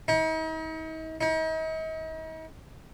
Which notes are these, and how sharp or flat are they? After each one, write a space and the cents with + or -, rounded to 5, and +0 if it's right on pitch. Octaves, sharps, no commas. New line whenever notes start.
D#4 +40
D#4 +40